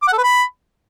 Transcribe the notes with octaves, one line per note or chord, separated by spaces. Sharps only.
D6
F#5
A4
B4
B5